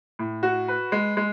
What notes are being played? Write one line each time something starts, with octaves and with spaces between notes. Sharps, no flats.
A2
F#4
B4
G#3
G#3